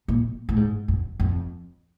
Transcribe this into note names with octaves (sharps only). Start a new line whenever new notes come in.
A#2
A2
G#2
F#2
F2